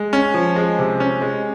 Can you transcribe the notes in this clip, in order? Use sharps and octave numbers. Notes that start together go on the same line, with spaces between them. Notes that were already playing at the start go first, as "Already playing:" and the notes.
Already playing: G#3
C#4
F3
G#3
C3
C#4
G#3